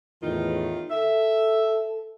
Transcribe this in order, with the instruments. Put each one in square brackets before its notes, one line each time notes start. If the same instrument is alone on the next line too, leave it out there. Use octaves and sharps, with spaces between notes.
[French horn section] E2 A2 [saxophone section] D#3 F4
[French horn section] A4 [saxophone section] E5